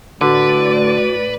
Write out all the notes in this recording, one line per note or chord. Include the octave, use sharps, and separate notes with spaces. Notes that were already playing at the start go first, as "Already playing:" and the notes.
A2 D3 F#4 B4 D5